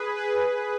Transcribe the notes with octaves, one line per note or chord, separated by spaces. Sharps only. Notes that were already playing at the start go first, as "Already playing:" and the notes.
Already playing: G#4 B4
G#4 B4